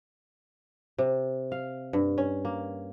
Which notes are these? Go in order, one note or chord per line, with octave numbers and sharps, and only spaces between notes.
C3
F5
G2
C#4
A#3